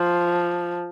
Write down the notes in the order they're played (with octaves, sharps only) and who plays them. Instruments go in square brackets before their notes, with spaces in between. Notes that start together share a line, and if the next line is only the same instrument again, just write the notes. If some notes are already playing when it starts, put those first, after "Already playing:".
Already playing: [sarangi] F3